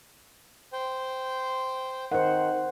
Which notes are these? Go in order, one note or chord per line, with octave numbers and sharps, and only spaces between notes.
C5 G5
D#3 C5 F#5